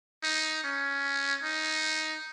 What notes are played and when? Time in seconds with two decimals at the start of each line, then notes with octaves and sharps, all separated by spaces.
0.23 D#4
0.64 C#4
1.43 D#4